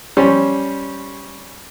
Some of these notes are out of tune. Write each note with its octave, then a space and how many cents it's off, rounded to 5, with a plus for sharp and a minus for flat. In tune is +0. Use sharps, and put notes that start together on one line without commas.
G3 -5 C#4 +0 C5 +0